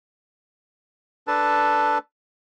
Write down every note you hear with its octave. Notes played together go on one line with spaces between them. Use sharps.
D4 A4 B4 A5